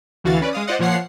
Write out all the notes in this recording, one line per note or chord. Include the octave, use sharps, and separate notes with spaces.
D2 E3 F#4 F5 A6
C#4 B4 D5
G#3 F5 D#6
F4 C5 D5 D#5 F#5
A#2 F3 C#5 F#5 C7